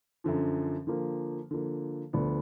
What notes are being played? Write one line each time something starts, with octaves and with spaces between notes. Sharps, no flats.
F#2 D3 F3
D3 F3 A#3
D3 F3 A#3
D2 D3 F3 B3 D4